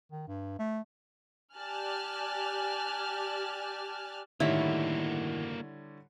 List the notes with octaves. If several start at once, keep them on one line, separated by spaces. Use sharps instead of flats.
D#3
G2
A3
G4 D5 G#5 A5 F6 F#6
A2 D3 D#3 G3 A#3 E4 F#4 C#5